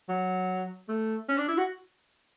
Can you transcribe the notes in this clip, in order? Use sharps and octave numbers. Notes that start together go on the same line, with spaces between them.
F#3
A3
C#4
D4
E4
F#4